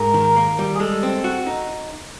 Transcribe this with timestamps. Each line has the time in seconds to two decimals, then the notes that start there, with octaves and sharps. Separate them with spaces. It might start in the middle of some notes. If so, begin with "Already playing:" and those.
Already playing: G#2 A#4
0.14 D#3
0.36 A#3
0.59 G3
0.75 G#4
0.80 G#3 A4
1.03 C4
1.24 F#4
1.47 D#4